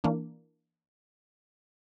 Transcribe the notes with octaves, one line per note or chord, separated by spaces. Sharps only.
E3 A#3 D4